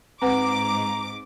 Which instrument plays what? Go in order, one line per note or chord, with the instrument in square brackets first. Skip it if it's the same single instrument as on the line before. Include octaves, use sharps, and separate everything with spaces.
[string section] G#2 D6 [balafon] C4 B4 F#5 [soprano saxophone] A#5